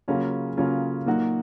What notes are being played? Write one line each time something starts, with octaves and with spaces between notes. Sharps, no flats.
C#3 F#3 A#3 C#4 F4
C#3 F#3 A#3 C#4 F4
A#2 F#3 A#3 D#4 F#4